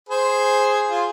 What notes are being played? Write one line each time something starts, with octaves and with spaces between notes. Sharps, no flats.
G#4 C5
F4 G#4